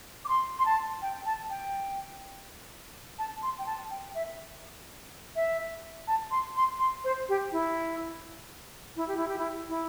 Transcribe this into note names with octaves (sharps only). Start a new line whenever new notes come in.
D6
C6
C6
A5
G5
A5
G5
A5
C6
G5
A5
G5
E5
E5
A5
C6
C6
C6
C5
G4
E4
E4
G4
E4
G4
E4
E4